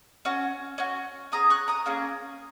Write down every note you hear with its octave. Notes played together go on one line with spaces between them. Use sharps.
C#4 F#4
C#4 F#4
C#4 G#4 A#5 D#6
C#6 F#6
A#5 D#6
A#3 C#4 G#4